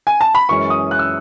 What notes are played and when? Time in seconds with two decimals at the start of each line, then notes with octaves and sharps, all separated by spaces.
0.07 G#5
0.21 A5
0.35 B5
0.49 F#2 E3 G#3 C#4 C#6
0.70 D#6
0.91 F#6
0.99 E6